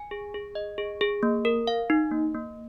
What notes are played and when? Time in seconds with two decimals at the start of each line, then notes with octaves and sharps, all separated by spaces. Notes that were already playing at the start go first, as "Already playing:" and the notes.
Already playing: G#5
0.11 G#4
0.34 G#4
0.55 D#5
0.78 G#4
1.01 G#4
1.23 A#3
1.45 A#4
1.67 F5
1.90 D#4
2.11 A#3
2.34 A#3